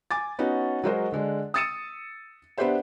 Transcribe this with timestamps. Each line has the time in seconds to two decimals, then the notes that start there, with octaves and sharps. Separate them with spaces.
0.11 G#5 D6 A6
0.39 B3 C#4 D#4 F#4
0.84 F#3 G#3 F#4 A#4 C5 D#5
1.12 D3 G#3 D4
1.54 D#6 E6 A6 C#7 D#7 E7
2.57 B3 D4 G4 B4 C5 E5